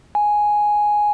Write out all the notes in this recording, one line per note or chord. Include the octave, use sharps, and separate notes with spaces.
G#5